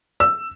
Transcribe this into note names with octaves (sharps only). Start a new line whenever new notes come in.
E6